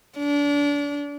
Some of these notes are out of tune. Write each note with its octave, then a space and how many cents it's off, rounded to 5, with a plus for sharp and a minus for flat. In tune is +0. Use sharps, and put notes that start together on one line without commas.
D4 -30